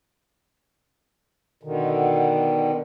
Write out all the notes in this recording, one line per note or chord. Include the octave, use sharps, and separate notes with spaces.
B2 D3 D#3